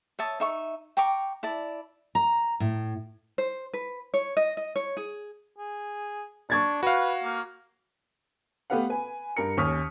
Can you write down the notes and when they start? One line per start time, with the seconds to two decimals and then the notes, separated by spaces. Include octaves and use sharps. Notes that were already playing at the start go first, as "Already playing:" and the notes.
0.19 C#5 E5 A5 D#6
0.40 D#4 E5 C#6
0.97 G5 A#5 C#6 D6
1.43 E4 D5 A5
2.15 A#5
2.60 A2
3.38 C5
3.74 B4
4.14 C#5
4.37 D#5
4.57 D#5
4.76 C#5
4.97 G#4
5.58 G#4
6.50 D4 C#6 G#6 A6
6.83 F#4 B4 F5
7.23 A#3
8.70 A3 B3 G4 B4 F5 F#5
8.90 B4 G#5
9.37 G2 A#4 C#7
9.57 D#2 C#4 C#6 D#6 F6 B6